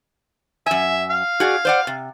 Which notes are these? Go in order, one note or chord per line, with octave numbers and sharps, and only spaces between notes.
F#2 E5 G#5
F5
F#4 G#4 D5
C5 D5 F#5
C3